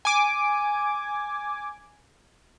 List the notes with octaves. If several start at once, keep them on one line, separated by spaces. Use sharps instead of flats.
G#5 D6